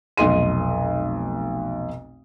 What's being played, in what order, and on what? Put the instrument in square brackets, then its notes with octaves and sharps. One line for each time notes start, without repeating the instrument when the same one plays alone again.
[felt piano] F1 B1 D#5 C6 D#7